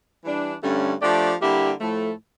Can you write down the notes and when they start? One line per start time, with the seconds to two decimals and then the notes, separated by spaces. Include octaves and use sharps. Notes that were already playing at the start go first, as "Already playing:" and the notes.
0.22 E3 G3 D4
0.62 G2 D3 A3 C#4
1.01 F3 A3 D4 G4 D5
1.41 D3 G3 A#3 E4 G4
1.79 A2 F3 A3